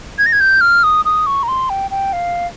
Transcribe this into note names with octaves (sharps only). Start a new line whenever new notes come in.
G#6
A#6
G#6
G6
F6
D#6
D#6
C#6
A#5
C6
G5
G5
F5